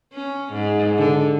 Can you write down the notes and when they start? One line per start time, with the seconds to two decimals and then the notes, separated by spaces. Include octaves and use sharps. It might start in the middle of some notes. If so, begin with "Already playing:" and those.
0.13 C#4
0.53 G#2
0.97 D3